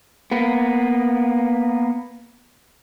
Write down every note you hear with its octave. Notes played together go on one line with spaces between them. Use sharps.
A#3 B3